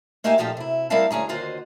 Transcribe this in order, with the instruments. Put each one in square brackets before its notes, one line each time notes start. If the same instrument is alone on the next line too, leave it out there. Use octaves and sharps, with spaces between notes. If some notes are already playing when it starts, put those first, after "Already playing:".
[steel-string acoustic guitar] A#3 D#4 G4 E5 F5 G#5
A#2 F3 D#4 F4 G4 A4
C3 E4
G3 C4 E4 A#4 F5 A5
D2 C#4 G#4 A#5
D#2 D3 F4 F#4 C5 D#5